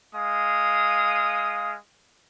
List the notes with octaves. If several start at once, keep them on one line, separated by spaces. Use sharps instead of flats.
G#3 F5 D#6